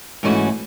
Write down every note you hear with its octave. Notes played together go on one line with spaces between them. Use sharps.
G#2 E3 A3 C#4 F#4